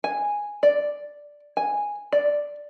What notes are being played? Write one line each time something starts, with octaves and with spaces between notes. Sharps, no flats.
G#5
D5
G#5
D5